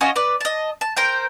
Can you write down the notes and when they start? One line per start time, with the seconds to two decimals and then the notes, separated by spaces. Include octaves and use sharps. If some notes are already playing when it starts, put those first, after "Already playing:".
0.01 C#4 F4 F#4 D#5
0.16 B4 D5
0.41 D#5 A5
0.81 A5
0.97 A#4 C5 G5